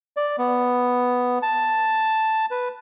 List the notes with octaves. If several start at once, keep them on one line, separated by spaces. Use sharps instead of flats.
D5
B3
A5
B4